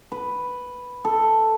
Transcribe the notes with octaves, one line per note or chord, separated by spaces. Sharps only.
B4
A4